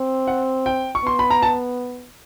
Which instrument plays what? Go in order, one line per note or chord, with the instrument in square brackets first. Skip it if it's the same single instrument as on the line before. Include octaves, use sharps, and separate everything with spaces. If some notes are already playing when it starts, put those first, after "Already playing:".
Already playing: [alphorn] C4
[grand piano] F#5
G5
C#6
[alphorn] B3 [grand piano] C6
[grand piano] B5
A#5
A5